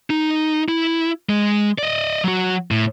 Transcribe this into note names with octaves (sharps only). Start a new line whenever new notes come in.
D#4
E4
G#3
D5 D#5
F#3 F#4
A2